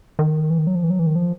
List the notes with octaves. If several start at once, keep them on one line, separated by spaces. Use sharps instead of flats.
D#3
E3
D#3
F#3
F3
E3
F#3
E3
D#3
F3